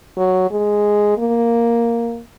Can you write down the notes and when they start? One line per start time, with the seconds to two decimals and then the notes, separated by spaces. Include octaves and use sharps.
0.17 F#3
0.51 G#3
1.18 A#3